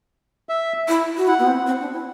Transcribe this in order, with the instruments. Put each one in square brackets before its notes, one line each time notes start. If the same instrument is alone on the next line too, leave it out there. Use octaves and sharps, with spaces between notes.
[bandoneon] E5
[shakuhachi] E4
F#4
[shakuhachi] E4 [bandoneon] F#5
[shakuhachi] B3
C4
C4
D4
E4